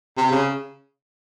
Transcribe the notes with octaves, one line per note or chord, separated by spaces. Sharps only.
C3
C#3